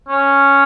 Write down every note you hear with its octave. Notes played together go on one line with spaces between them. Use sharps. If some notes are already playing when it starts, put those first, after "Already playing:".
C#4